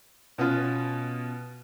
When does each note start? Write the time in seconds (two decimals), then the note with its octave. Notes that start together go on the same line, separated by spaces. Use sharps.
0.38 B2 B3 C#4 F4